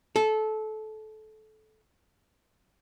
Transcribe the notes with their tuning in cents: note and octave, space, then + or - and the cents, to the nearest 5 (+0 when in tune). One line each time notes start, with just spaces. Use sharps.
A4 -20